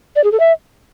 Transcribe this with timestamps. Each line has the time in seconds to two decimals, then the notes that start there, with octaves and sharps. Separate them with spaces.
0.16 D5
0.24 G#4
0.32 A4
0.40 E5